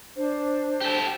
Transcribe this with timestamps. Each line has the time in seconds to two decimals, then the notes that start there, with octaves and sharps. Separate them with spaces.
0.16 D4 C5
0.81 G4 A4